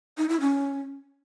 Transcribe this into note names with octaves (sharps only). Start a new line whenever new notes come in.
D#4
E4
C#4